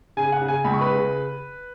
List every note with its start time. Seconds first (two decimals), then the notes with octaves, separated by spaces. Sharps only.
0.17 C#3 G#5
0.32 F#5
0.42 C#3
0.48 G#5
0.64 C#2 B5
0.73 C#6
0.81 B4 B5
0.89 C#3